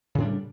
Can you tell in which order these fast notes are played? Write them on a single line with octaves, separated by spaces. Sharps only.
C#3 A2 D4 G3